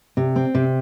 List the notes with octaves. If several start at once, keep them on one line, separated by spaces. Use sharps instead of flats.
C3
C4
C3